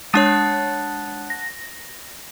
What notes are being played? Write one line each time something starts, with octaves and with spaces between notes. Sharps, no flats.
G#3 D4 C#5 F#5 A5 D#6
A#6